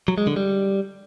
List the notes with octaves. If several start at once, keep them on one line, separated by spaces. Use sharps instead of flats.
F#3
G#3
D3
G3